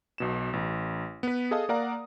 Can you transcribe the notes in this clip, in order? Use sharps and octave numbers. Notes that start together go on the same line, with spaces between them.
B1 B2 E7
A1
B3 B4
G#4 A4 D#5 F5 A5 D#6
A#3 A#4 D5 F5 F#5 A#5